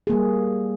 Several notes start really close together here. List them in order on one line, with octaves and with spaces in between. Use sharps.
G#4 A#3 G3